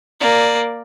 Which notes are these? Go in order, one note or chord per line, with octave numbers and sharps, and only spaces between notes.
A#3 D5